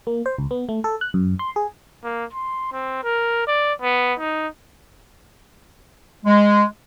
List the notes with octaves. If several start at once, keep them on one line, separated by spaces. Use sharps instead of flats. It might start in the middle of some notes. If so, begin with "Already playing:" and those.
A#3
C5
C#2
B3
A3
A4
F#6
F#2
C6
G#4
A#3
C6
C4
A#4
D5
B3
D#4
G#3